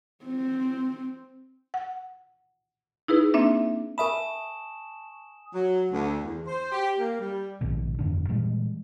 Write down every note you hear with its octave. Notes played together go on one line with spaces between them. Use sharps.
C4
F#5
D#4 E4 G#4 B4
A#3 C4 D4 E5
A#4 E5 G#5 A5 B5 C#6 D#6 E7
F#3
D2
E2
C5
G4
A#3
G3
A#1 D#2 G#2 B2
G1 F2 D3 D4
A#2 E3 G3 G#3